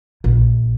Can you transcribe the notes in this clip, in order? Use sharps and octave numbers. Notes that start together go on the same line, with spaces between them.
A#1